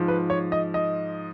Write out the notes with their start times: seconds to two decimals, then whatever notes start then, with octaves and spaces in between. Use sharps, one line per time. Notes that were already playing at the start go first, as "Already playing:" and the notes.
Already playing: G#2 F3
0.08 B4
0.30 C#5
0.52 D#5
0.74 D#5